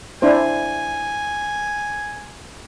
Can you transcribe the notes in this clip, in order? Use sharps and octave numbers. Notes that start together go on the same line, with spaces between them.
D4 E4 C5 G#5